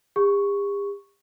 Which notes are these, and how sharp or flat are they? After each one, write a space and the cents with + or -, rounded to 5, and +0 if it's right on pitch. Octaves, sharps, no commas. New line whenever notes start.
G4 +45 C#6 +0